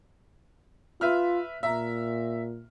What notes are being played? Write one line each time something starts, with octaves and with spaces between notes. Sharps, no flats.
F4 B4 E5 F6
A#2 E5 A#5